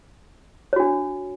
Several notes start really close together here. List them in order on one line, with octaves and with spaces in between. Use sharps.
C#5 F#4 D4